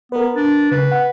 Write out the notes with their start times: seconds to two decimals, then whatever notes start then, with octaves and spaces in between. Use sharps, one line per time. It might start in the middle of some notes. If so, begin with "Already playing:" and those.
0.12 B3 A#4 B4
0.35 D4
0.72 C#3 B4
0.92 F#5